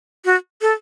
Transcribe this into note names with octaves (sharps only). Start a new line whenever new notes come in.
F#4
A4